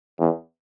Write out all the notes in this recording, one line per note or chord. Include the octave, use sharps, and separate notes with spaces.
E2